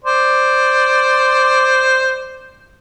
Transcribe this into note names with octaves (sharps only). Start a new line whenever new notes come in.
C5 D5